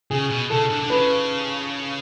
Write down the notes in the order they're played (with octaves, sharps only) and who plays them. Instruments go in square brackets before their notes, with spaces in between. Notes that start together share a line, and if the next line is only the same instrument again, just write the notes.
[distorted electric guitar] C#3 [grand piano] G#4
[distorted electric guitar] B2
[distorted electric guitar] C#3 [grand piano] A4
[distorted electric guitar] D3
D3
[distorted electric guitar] C#3 [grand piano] B4